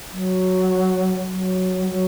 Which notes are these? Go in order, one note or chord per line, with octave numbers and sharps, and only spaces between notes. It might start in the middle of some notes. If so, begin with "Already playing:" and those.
F#3
F#3
F#3